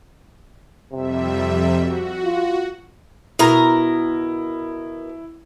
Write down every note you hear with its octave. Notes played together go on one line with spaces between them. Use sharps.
F2 C3 G3 E5
F#4
F4
B2 E4 A#4 A#5